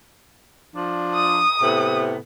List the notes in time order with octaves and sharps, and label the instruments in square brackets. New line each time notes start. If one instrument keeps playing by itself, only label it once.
[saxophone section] F3 D4
[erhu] D#6
[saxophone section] A2 C3 B3